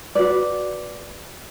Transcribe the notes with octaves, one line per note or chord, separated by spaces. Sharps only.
F#4 B4 D5